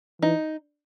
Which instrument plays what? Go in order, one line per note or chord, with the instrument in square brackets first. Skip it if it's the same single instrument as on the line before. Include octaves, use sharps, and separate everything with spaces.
[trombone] E3 [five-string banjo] D#4